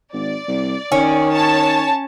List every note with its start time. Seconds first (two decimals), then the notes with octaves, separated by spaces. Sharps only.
0.13 G#1 D5
0.48 C2
0.92 D#3 C#4
1.31 C#5 A5